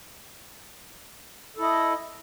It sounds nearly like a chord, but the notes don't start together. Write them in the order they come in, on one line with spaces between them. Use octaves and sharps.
A4 E4 D#5